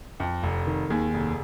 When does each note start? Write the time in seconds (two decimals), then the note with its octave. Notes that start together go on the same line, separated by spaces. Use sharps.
0.20 F2
0.43 F1
0.67 D#3
0.90 D#2 G#4
1.14 F1